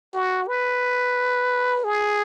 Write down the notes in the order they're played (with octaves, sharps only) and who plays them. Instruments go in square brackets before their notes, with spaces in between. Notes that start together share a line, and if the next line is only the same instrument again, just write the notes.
[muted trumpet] F#4
B4
G#4